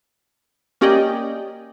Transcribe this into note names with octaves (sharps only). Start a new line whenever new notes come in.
A#3 C#4 G4 D5 D#5 G5